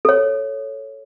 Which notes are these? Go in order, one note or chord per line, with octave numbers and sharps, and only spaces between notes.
A4 C#5